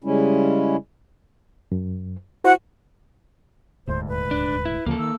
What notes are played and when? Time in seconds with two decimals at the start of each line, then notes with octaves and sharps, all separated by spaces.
0.04 C#3 G3 G#3 C#4 E4
1.72 F#2
2.44 E4 F#4 C5 F#5
3.87 D#1 D2 G#2 C5
4.08 B4
4.31 D4
4.65 E4
4.86 D2 C#3 F3 A#3 A4
4.99 D#3 E6